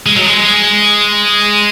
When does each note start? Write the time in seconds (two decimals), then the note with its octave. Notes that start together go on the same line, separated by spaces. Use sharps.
0.06 G#3
0.16 F#3
0.26 G#3